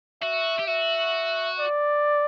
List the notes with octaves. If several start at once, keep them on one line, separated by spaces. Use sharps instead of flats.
F#4 E5
G4
F#4 E5
D5